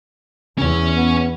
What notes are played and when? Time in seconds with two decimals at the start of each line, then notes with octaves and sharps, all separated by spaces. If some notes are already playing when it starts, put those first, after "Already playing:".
0.58 E2 C#4 C#5
0.95 B3